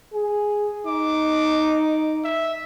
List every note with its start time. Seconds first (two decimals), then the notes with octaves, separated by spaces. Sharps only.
0.14 G#4
0.87 D#4 D6
2.24 E5